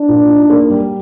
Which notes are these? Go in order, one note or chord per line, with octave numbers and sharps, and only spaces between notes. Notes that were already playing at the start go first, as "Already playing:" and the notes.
Already playing: D4
A#2
D#4
A#3
G3